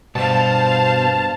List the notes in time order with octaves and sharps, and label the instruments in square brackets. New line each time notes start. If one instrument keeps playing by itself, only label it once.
[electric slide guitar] G2 [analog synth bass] B2 [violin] C5 F5 [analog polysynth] A5